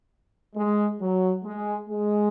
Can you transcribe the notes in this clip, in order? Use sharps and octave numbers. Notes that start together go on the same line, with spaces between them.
G#3
F#3
G#3
G#3